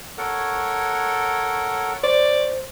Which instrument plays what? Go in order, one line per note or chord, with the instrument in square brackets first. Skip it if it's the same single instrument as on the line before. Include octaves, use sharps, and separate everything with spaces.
[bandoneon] A4 A#4 F#5 [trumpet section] C#5
[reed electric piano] C5 [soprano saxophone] D5